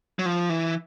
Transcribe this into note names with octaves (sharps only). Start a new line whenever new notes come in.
F#3
F3
E3